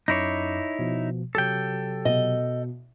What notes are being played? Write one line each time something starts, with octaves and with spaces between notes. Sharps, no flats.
F#2 D#4 E4 C#5 D6 C7
B2 F3
C3 F#3 G4 A4 G5
B2 D#5